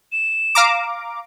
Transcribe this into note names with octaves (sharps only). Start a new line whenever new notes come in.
E7
F5 A#5 D6